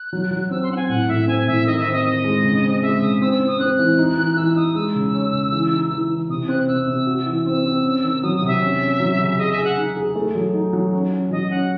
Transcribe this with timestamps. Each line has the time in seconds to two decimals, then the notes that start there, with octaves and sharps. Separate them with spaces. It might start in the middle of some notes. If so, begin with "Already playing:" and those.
Already playing: F#6
0.13 F#3
0.31 F#3
0.46 F#6
0.51 C4 E6
0.63 C6
0.70 C4 F#5
0.77 G#5
0.89 A2 F#5
1.09 A2 E5
1.27 C4 G#5
1.47 A2 E5
1.67 D#3 D#5
1.80 E5
1.86 C4
1.93 D#5
2.05 D#3 D#5
2.25 G#3
2.44 C#3
2.63 C4
2.82 G#3 E5
3.01 C#3 D#6
3.21 C4 E6
3.33 E6
3.40 C4
3.47 D#6
3.60 C4 F#6
3.79 E3
3.98 D#4
4.17 E3
4.36 E3 E6
4.56 D#4 D#6
4.75 G#3 E6
4.95 C#3
5.14 C#4
5.33 C#3
5.52 E3
5.72 D#4
5.91 E3
6.10 E3
6.29 C3 D#6
6.48 C4 F#6
6.68 C3 E6
6.88 C3
7.07 F#4
7.26 E3
7.45 C4 E6
7.65 C4
7.84 C#4
8.03 D#3
8.23 F#3 D#6
8.35 D#6
8.42 C3
8.48 E5
8.61 C#4
8.81 C#4
9.00 F#3
9.20 C#3
9.38 G#4 D#5
9.52 E5
9.57 G#4
9.64 F#5
9.77 D#4
9.97 G#4
10.16 A3
10.35 F#3
10.54 D#4
10.73 F#3
10.93 C#4
11.12 C#4
11.31 F#3 D#5
11.51 C#4 F#5